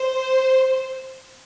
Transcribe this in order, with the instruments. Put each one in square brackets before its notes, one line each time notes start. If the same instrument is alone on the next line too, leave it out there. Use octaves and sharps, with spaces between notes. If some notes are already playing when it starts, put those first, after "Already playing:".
Already playing: [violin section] C5